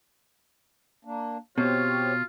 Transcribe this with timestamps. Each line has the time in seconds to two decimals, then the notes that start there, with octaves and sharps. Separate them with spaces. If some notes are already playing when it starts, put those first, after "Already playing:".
1.05 A#3 D4
1.58 B2 C4 F4 G4 C#5